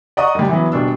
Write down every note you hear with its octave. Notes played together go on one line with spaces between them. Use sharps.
D5 D#5 F#5 A#5 C#6 D#6
F#1 G3
E3 F#3 B3
D#1 B2 D4 E6